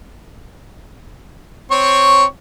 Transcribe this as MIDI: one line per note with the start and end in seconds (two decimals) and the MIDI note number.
1.71 2.25 60
1.71 2.25 73
1.71 2.25 85